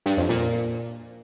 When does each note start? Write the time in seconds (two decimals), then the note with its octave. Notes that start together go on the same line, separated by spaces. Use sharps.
0.06 G2
0.17 F2
0.29 A#2